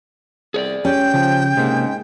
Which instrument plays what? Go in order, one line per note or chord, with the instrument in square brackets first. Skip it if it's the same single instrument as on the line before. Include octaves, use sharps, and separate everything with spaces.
[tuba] C2 [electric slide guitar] G#4 C#5 D5
[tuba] C#2 [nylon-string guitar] C#4 G4 [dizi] G5
[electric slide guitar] C#3 [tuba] F3
[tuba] G#2 [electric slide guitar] C3 A#3